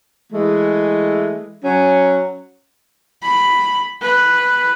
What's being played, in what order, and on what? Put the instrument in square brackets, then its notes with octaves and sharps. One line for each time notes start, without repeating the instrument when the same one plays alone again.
[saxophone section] E3 G#3 A3
F#3 C#4
[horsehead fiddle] B5
B4